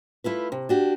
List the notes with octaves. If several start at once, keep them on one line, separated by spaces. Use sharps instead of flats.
A3 E4 F4 B4
C3
D4 F#4 G4